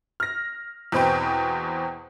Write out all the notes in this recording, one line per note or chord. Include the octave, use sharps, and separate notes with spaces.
F6 A#6
E2 B2 C4 B4 G5